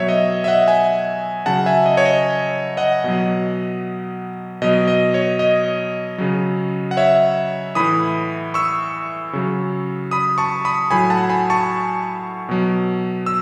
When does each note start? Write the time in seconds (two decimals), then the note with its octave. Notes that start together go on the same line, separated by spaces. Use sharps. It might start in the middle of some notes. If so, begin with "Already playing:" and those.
Already playing: B2 F#3 C#5 E5
0.09 D#5
0.44 E5
0.47 D#5 F#5
0.68 E5 G#5
1.46 C#3 F#3 F#5 A5
1.66 E5 G#5
1.86 D#5
1.97 C#5
2.05 D#5
2.77 D#5 F#5
3.04 B2 F#3
4.62 B2 F#3 D#5
4.88 D#5
5.14 C#5
5.39 D#5
6.18 C#3 F#3
6.91 F#5
6.97 C#5 E5
7.75 A2 E3 B5 D#6
8.54 C#6 E6
9.33 C#3 F#3
10.11 B5 D#6
10.38 A5 C#6
10.65 B5 D#6
10.91 A2 F#3 G#5 B5
11.10 F#5 A5
11.29 G#5 B5
11.50 A5 C#6
12.49 B2 F#3
13.26 E6